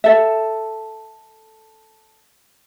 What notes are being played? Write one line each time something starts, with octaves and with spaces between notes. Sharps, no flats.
A4 E5